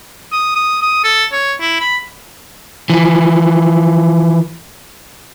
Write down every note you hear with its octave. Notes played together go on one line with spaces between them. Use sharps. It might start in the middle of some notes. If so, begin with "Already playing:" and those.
D#6
D#6
D#6
A4
C#5
E4
B5
E3 F3